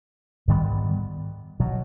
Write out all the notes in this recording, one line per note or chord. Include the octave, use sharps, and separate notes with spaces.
G#2 D#3 G3 B3
B2 F#3